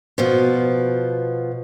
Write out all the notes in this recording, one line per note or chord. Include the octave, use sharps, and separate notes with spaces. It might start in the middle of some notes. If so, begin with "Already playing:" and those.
B2 F3